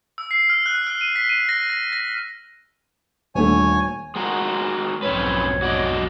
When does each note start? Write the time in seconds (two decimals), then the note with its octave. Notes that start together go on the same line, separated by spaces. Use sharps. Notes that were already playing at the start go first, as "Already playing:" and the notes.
0.18 E6
0.31 C7
0.49 F6
0.66 F#6
0.87 F6
1.01 D#7
1.16 B6
1.29 D#7
1.49 A#6
1.70 A#6
1.92 A#6
3.35 D#1 D3 A3 C#5 G#5
4.16 G#3 F#4 A#4
5.03 B1 F2 G#2 C4 C#4 B4 C#5
5.62 F#4 D5 D#5